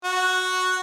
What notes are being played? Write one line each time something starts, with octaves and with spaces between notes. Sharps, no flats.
F#4